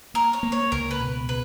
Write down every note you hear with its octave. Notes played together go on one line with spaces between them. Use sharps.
A#3 A#4
C#5
A#3
C#5
C#2 A#4
B4
B2
C#3 B4